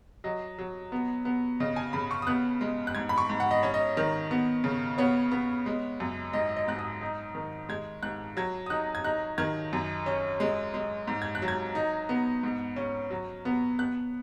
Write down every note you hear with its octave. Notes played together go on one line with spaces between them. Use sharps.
F#3 D#5
F#3
B3
B3
C#3 D#5
G#5
C#3 B5
C#6
D#6
B3 F#6
G#3
F#6
G#2 G#6
B5
C#6
G#2
F#5
D#5
C#4 C#5
D#5
D#3
B3
C#3
B3 C#5
B3
G#3
F#2
G#2 D#5
D#5
G#2 F#6
D#6
D#4
D#3
G#3 G#6
G#2 F#6
F#3 G#6
D#6
D#4 F#6
G#6
D#4 F#6
D#3 G#6
F#2
C#4
G#3
G#3
G#2
G#6
F#6
F#3
G#6
D#4
B3
G#2
C#4
F#3
B3
B3 F#6